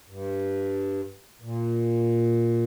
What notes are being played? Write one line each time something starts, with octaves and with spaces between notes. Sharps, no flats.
G2
A#2